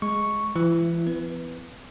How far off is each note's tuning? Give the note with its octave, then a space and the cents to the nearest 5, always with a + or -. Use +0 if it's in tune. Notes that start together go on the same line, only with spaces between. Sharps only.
G#3 +0 C#6 +0
E3 +35 E4 +20
B3 +45 B4 +0